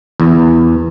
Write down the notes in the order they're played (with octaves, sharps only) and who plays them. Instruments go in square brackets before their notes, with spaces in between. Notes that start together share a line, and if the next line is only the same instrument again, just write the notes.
[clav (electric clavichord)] E2